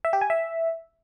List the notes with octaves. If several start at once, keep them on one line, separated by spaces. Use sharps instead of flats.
E5
G4
G#5
E5